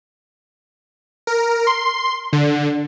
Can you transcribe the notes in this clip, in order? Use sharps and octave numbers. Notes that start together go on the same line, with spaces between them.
A#4
C6
D3